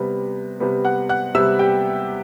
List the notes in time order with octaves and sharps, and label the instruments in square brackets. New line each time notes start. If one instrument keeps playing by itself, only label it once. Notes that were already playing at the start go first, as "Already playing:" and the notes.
Already playing: [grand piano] C3 G3 B3
C3 G3 B3
F#5 F#6
F#5 F#6
C3 G3 B3 E5 E6
G4 G5